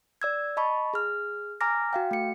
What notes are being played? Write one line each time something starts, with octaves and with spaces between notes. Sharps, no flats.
D5 E6 G#6
D#5 A5 B5 C#6
G#4 F6
G#5 A#5 D6 F6 A#6
F#4 F5 G5
A3 C#7